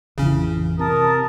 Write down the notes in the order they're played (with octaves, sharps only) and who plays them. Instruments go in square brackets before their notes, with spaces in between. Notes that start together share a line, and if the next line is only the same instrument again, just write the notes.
[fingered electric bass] A1 F2 E3 [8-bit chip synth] C#3 C#4
[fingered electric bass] C3 [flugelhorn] A#4 [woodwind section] A5 D#6